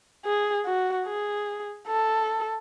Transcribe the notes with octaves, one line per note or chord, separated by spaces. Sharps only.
G#4
F#4
G#4
A4